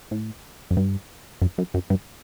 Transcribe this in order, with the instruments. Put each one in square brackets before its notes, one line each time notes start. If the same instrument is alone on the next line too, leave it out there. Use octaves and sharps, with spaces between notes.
[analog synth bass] A2
F#2
G2
F#2
F#2
F#2
G2